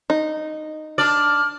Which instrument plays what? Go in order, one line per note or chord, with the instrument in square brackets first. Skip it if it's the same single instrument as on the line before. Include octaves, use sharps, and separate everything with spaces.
[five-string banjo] D#4
[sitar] D4 D5 [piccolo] F6